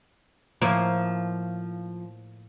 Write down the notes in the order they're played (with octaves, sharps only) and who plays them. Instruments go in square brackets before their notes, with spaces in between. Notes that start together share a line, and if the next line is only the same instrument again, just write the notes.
[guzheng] A2 A#3 [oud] F3